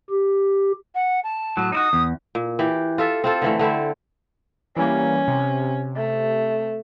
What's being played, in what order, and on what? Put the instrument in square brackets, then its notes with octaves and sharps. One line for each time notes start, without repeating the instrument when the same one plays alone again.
[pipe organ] G4
[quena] F#5
A5
[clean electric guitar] A2 F#3
[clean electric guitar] D#4 E4 F#4 [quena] D#6
[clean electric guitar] E2
[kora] A#2
E3 G4
F4 A4 E5
C4 F4 A4
D3 E3 A3
D3 A3 C4 E4
[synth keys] E3 G3 A#3 [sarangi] C#4
[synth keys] C3
[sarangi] A3